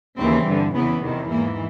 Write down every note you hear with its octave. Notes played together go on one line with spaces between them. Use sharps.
D#2 C#3 E3 C4
G2 D3
E2 C#3 E3 B3
E2 C3 D#3
G#2 E3 A#3